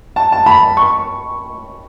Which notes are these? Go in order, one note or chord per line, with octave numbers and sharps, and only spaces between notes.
A5
A5
B5
C#6